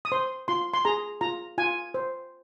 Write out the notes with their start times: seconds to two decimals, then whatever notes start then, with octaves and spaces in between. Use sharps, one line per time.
0.05 D#6
0.12 C5 C6
0.48 F4 C6
0.74 C6
0.85 G#4 A#5
1.21 F4 A#5
1.58 F4 G#5
1.94 C5